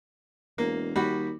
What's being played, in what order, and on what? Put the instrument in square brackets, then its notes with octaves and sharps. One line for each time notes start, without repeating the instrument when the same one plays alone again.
[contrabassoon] E1 [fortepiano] A#3
[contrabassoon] D#2 [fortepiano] G3 F#4 B5